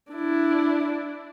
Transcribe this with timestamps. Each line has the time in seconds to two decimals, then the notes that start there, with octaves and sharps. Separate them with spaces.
0.12 D4 E4